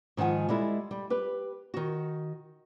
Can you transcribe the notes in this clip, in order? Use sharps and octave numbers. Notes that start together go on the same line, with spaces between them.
G#2 D#3 F3 F#5 G#5
G3 G#3 E4 A4
G3
G4 B4
D#3 F#4